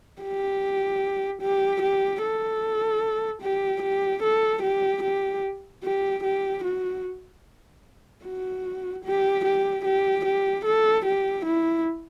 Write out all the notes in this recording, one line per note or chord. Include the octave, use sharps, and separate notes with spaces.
G4
G4
G4
A4
G4
G4
A4
G4
G4
G4
G4
F#4
F#4
G4
G4
G4
G4
A4
G4
E4